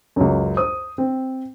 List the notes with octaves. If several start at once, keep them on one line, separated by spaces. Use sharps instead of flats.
C#2 F#2
C5 D#6
C4